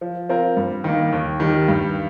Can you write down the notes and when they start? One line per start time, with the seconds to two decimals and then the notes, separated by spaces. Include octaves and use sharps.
0.01 F3
0.29 C4 F4 A#4
0.57 G2
0.84 D#3 A#3
1.12 D#2
1.40 D#3 G3
1.68 G2